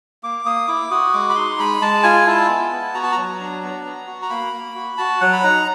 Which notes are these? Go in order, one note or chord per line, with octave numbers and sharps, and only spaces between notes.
A#3 D6
A#3 D#6
E4 D6
F#4 D#6
G#3 D6
B5
D#4 C6
G#3 B5
G#3 A5
F4 G#5
E4 A5
B3
B3
F#4 A#5
A5
A#5
F#3
D4
B3
B3
F#4
A#5
A#3 B5
A#3
F#4
F#4 A5
F#3 F#5
B5
D#4 A#5